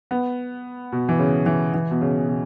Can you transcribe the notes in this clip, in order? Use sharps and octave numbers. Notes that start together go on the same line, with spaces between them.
B3
B2
E3
C#3
E3
E3
B2
C#3
B2